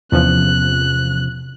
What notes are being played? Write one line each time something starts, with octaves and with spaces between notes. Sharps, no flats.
E2 C3 F3 C#4 F#6